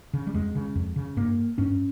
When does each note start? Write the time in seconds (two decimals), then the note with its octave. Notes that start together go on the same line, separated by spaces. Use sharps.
0.14 C#3
0.27 G3
0.34 F2 G#3
0.55 C#3
0.75 F2
0.96 C#3
1.17 G2 A#3
1.58 G2 C#4